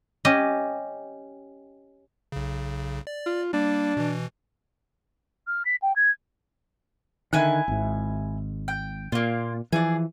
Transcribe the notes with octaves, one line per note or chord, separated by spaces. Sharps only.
C#4 G4 D#5
B1 C#3
D5
F4
G3 A#3 D4
B2 E3
F6
B6
G5
G#6
D3 D#3 E4 G#5 F#6
G#1 G#2
G5
A#2 A#3 F4
E3 F3 G#4 D5